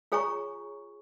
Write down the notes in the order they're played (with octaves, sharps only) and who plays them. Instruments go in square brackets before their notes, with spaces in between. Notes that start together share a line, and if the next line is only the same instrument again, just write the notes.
[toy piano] F4 G#4 C#5 G#5 A#5 C#6